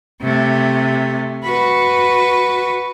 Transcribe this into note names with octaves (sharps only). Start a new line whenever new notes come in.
C3 A3
F#4 B4